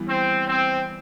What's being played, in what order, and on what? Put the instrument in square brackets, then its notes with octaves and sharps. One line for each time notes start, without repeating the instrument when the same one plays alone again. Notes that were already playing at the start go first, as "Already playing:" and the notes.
Already playing: [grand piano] E3 G3 B3
[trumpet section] C4
C4